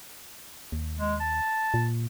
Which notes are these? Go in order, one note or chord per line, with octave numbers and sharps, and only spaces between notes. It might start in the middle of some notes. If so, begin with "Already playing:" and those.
D#2
G#3
A5
A#2